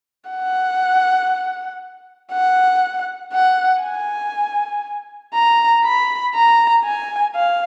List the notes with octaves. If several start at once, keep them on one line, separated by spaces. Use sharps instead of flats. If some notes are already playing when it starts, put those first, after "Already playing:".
F#5
F#5
F#5
G#5
A#5
B5
A#5
G#5
F5